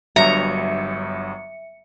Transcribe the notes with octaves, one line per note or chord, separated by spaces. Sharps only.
G1 G2 F#3 E5 A#5 C#7